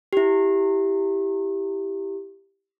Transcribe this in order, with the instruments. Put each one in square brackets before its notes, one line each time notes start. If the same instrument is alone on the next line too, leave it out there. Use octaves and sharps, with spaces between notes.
[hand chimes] E4 G4